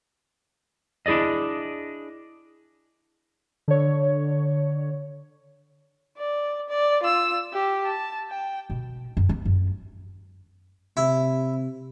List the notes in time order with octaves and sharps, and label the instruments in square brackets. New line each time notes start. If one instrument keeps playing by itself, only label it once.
[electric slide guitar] D4 E4 G#4 D5 D#5
[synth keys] D3 C#5
[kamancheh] D5
D5
F4 E6
G4
A5
G5
[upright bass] B2
F#2
B3
F#2
[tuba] C3 [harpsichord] E4